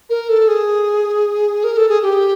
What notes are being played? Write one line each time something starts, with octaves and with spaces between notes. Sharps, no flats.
A#4
A4
G#4
A#4
A4
G#4
G4